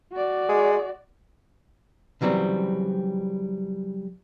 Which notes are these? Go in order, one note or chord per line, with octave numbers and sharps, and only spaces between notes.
F#4 D5
G#3
C#3 E3 F#3 G3 C4